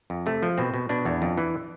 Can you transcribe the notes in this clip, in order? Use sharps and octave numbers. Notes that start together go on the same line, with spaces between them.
F2
C3 A3
F3
B2 C4
B2
B2 D4
E2
F2
E3